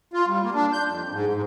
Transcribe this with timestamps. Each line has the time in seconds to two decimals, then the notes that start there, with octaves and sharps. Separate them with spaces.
0.14 F4
0.27 G3
0.43 A#3
0.55 D4
0.73 G6
0.85 F2
1.11 G#2
1.33 G#2